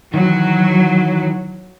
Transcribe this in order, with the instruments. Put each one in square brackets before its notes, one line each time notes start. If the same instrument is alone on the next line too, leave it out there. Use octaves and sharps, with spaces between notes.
[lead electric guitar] D#3 E3 [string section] F#3